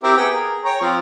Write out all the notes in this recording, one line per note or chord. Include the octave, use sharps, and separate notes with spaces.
C4 E4 G4 A#4
B3 G#4 G5
A#4
C#5 G5 A#5
F3 C4 F4